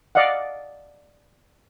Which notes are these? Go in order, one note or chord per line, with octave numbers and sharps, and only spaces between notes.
D5 D#5 F5 F#5